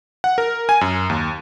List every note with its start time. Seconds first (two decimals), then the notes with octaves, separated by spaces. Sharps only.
0.24 F#5
0.38 A#4
0.69 G#5
0.81 F#2
1.10 D#2